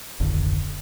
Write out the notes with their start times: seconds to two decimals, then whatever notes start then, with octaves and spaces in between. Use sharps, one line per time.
0.20 D1 G#1 F2 D3